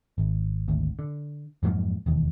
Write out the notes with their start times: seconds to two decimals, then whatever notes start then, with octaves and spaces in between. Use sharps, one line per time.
0.18 G#1
0.68 G#1 D2
0.99 D3
1.63 F2 G#2 F#3 A#3
2.06 E1 D#2